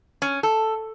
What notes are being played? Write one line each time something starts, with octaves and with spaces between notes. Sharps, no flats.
C#4
A4